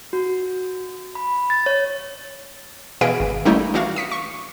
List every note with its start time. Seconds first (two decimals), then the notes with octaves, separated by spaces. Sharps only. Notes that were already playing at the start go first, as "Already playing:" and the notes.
0.13 F#4
1.15 B5
1.50 A6
1.66 C#5
3.01 B2 E3 G#4 B4 F5 D7
3.20 G#1
3.45 G3 A3 A#3 C#4 D#4 E4
3.74 E3 D4 F#4 F5
3.96 D#6 B6 C#7
4.12 C#6